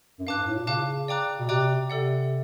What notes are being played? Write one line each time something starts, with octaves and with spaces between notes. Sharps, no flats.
F#2
G2 F5 A5 D6 F#6
G#2
A2
A#2
C#3 F5 A5 D6 F#6
D5 G5 A#5 D6 F#6
B2
C3 D5 G5 A#5 D6 F#6
C3 A4 D5 F#5